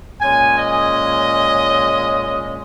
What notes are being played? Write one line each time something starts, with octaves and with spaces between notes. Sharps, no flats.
A#2 G#3 C#4 G#5
D#5